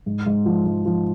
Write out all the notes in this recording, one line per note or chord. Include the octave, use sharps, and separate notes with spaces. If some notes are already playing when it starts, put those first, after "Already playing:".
G#2
G#2
F3
G#2
F3